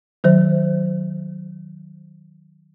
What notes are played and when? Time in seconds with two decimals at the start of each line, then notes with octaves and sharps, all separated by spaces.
0.24 D#3 F#3 C5